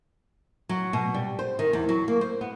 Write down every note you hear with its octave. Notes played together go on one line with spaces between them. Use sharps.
F#3
B2
G3
C5
D#3
E2
F#3
A#3
C5
B3